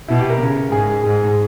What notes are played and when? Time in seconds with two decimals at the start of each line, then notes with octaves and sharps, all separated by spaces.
0.08 B2 E4
0.19 G4
0.30 A#4
0.40 C#3
0.71 G#2 G#4
1.03 G#2 G#4